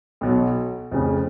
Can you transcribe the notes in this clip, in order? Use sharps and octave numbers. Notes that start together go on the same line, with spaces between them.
B1 B2 F#3
F1 F2 C#3